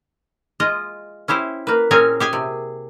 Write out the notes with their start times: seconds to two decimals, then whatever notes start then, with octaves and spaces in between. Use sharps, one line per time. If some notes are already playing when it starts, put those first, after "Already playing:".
0.60 G#3 F4 D#5
1.28 C#4 E4 G4 C5
1.67 A#3 B4
1.91 A#2 C4 C#4 G#4 A#4 G#5
2.20 G4 G#4 G#5
2.33 C3